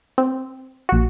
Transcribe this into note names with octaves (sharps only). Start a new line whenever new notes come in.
C4
A#1 F#4